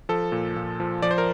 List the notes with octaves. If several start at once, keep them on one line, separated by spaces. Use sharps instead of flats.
F3 A4
A#2
A#2
F3
F3 D5
C5
A#4